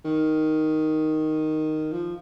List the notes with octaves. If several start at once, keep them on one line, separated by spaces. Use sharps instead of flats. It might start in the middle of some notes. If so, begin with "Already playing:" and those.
D#3
F3